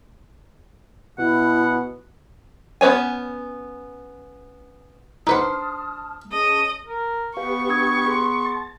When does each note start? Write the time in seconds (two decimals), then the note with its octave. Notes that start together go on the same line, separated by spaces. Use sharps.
1.19 B2 E4 F#5
2.81 B3 C#4 B4 C#5 G#5
5.27 D4 D#4 B4 C5 F#5 A5 D#6 F6
6.32 C#4 G#4 D#5 A5
6.87 A#4
7.37 B3 G4 B4 F5 C#6
7.69 D4 D#6 G#6
8.06 G#4 C6
8.44 A5